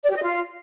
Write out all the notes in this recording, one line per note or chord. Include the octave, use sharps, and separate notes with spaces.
D5
G4
D#5
F4